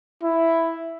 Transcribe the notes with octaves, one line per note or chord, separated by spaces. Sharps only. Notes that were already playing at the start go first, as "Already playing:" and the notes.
E4